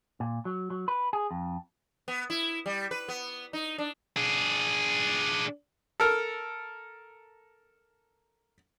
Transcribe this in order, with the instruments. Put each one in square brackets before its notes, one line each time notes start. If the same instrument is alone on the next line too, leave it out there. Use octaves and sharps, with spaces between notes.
[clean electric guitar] A#2
F#3
F#3
B4
G#4
F2
[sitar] B3
E4
G3
B4
B3
D#4
D4
[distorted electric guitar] D4 G#4
[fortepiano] A4 A#4